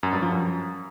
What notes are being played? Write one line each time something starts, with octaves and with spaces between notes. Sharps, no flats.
F#2
G2
F3
F#2